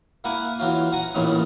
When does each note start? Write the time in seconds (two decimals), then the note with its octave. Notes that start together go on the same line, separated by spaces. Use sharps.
0.24 A#3 E4 F#5 G#5
0.59 E3 F#3 C#4 F4
0.93 F#5 G#5 A#5
1.14 A1 G2 A#2 E3 C#4 D#4